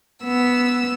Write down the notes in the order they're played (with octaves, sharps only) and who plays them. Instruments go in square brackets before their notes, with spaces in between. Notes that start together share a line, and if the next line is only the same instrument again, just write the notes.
[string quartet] B3 E6